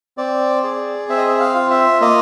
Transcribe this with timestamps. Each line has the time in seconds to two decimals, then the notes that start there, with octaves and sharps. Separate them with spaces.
0.17 C4 D5
0.63 G#4 D5
1.09 C4 E5
1.18 D#5
1.28 E5
1.40 F5
1.55 F4
1.70 E5
2.01 A#3 D#5